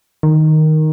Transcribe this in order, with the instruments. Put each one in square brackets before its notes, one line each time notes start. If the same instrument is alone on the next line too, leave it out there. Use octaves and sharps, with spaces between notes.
[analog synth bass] D#3